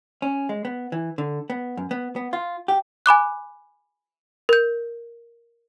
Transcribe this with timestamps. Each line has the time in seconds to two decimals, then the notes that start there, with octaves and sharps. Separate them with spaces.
0.22 C#4
0.49 G#3
0.65 B3
0.92 E3
1.18 D3
1.50 B3
1.77 F#2
1.91 B3
2.16 B3
2.33 F4
2.68 G4
3.06 G#5 B5 D6 F#6
4.49 A#4 G6